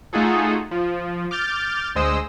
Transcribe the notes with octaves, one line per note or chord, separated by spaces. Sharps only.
A3 D#4 F4 F#4 G#4 A4
F3
D6 F6 G6 A6
D2 G#3 C5 D#5 E6